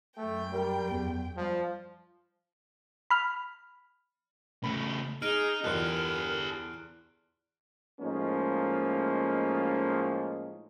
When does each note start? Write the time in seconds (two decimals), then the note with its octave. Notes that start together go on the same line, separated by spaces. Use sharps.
0.17 F#2 A3 G5
0.52 G3 A#4
0.89 E2
1.37 F3 G3
3.10 B5 F6
4.64 C#3 A3 B5
5.22 D#4 G#4 F6 D7
5.64 E2 F4 G4 A4 A#4 F#6
8.00 A2 F3 G#3 A#3 C#4 D#4